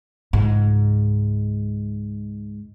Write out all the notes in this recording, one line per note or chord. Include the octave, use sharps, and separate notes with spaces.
C#2 G#2